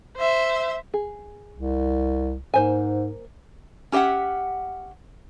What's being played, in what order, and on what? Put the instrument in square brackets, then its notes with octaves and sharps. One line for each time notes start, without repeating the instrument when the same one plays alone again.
[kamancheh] C5 E5
[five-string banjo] G#4
[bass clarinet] C2
[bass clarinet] G#2 [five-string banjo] A#3 C5 G#5
[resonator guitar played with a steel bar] C#4 G4 D#5 E5 F#5